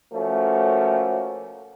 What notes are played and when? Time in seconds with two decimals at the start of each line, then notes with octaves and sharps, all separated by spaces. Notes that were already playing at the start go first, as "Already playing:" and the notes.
0.13 F3 A3 A#3 C#4 F#4